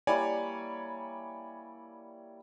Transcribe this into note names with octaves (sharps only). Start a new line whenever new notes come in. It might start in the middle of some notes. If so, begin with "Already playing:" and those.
G3 A#3 E4 C#5 D5 G#5